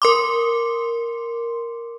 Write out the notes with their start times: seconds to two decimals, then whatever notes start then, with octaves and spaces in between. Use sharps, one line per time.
0.02 A#4 C6 D6